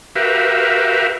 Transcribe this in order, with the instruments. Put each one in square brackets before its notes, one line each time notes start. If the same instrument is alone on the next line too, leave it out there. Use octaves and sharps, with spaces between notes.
[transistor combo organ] F#4 G4 A#4 B4 E5 F5